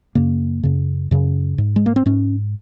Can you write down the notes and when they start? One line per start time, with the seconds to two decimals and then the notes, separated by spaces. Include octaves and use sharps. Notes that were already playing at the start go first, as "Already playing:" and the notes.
0.15 F#2 C#3 A#3
0.63 F#2 C#3
1.11 F#2 C#3
1.58 G#2
1.76 G#3
1.86 A#3
1.96 C4
2.06 G#2 C#4